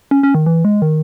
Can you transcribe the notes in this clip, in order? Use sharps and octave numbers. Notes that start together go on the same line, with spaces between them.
C#4
C#4
D#3
E3
G#3
D#3